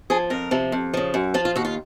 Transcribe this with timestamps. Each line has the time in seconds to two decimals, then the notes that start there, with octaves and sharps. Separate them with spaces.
0.10 F3 G#4
0.30 F2 A#4
0.51 C3 F3
0.72 F2
0.94 C#3 F3
1.14 F#2
1.34 F3 F4
1.45 F4
1.56 D#2 F#4
1.65 F4